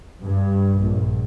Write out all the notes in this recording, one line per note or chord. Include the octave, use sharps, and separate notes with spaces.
G2
A#1